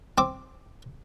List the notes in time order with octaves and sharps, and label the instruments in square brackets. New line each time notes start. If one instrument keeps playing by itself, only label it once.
[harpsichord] C4 D6